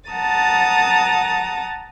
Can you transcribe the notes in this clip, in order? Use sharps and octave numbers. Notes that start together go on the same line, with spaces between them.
F#5 A5 A#5 D#6 A6